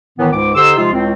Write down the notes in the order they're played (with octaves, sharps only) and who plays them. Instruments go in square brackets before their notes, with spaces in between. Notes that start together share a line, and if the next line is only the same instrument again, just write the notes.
[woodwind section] A2 D#3 E3 B3
C#2 G#2 D6
D3 D#4 G4 C5 C6 E6
C3 F3 G#3 D#4 F4
C#2 A2 C4